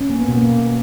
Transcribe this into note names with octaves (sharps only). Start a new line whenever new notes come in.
C#4
A#3
B3
B2
A#3